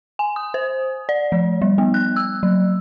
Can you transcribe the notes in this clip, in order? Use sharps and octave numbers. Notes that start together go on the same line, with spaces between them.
G#5
D#6
C5
D5
F3
G3
B3
F#6
E6
F#3